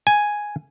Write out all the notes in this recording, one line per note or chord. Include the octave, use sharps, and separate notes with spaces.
G#5